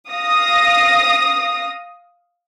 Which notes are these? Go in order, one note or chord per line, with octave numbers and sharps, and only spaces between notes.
F5 D#6 A#6